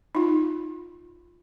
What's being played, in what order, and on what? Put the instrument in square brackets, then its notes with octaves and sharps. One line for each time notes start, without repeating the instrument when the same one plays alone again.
[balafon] D#4 F4